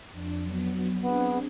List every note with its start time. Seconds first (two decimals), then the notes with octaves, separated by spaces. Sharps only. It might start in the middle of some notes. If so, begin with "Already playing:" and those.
0.11 F2 D4
0.42 F#3 B3
1.01 B3 C4 D4 G#4